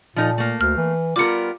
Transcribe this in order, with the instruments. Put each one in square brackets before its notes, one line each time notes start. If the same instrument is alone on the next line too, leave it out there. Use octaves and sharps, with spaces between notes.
[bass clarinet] A#2 [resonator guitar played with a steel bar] F3 D#4 A4
[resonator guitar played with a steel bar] A3 A#3
[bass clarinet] D2 [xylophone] F6
[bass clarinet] E3
[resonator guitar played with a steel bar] G3 B3 A#4 [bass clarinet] F4 [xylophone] D6 C#7